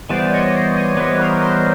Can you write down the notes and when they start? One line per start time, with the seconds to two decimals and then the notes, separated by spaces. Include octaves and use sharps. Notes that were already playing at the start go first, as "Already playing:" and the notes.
0.09 E3 G3 B3 C5 D5
0.31 C#5 D#5
0.53 C5 D5
0.75 C#5 D#5
0.97 E3 G3 B3 B4 C#5
1.19 A#4 C5
1.33 B4
1.41 A#4 C5